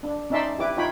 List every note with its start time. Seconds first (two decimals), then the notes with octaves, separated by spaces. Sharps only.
0.03 D4
0.30 C#4 D#4 D5 E5 A5 C6
0.58 E4 G4 B4 D6
0.76 D#4 F4 C#5 G5 B5